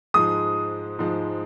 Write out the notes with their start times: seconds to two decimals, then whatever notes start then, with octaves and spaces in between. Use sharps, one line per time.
0.14 G#2 F3 G#3 D#6
0.99 G#2 F3 G#3